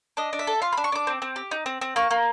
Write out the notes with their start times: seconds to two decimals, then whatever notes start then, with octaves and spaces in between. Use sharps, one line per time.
0.17 D4 D#5
0.33 D4
0.39 E5
0.47 A4
0.62 F4 F5
0.73 D4 B5
0.84 C#6
0.92 D4 D6
1.07 C4
1.22 C4
1.36 G4
1.51 D#4
1.66 C4
1.81 C4
1.96 A#3 C#6
2.11 A#3